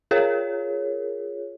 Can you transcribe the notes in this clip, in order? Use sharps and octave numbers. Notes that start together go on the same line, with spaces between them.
F4 G#4 A#4 C#5